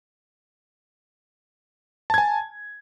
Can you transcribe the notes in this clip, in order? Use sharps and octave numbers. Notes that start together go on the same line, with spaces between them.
G#5 A5 G#6